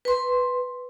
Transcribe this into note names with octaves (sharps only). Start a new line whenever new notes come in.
B4 C6